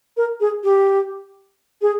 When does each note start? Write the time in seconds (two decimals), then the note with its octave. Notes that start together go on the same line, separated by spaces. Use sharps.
0.17 A#4
0.40 G#4
0.64 G4
1.82 G#4